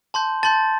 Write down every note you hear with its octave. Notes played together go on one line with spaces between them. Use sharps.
A5 C6 G6
A5 C6 G6 A6